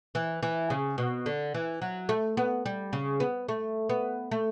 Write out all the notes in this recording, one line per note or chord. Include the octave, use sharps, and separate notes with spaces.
E3
E3
C#3
B2
D3
E3
F#3
A3
B3
G3
C#3
B3
A3
B3
A3